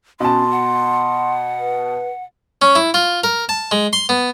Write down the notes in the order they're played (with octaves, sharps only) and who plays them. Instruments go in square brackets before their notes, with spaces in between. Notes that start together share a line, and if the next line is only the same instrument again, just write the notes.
[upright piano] B2 A5 [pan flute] C#4 [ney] C6
[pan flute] F#5
[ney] B4
[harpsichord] C#4
E4
F4
A#4
A5
G#3
C6
B3